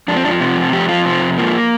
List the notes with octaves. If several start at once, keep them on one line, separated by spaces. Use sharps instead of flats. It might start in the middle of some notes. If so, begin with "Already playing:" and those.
F2 D4
C4
F3 D4
C3
F2
F2 G4
F3 F4
C3 C4
F2
F3 A#3